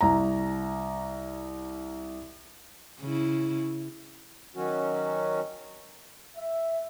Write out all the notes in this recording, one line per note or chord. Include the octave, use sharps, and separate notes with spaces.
C2 A#5
C#3 E4
D#3 F#3 C#4 F#4
E5